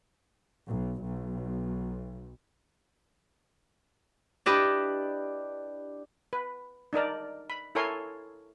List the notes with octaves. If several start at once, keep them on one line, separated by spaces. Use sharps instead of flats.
B1
B1
D4 E4 G4 B4 D5 D#5
B4
D4 D#4 A#4 D5
B5
E4 A4 A#4 C#5 G#5 C6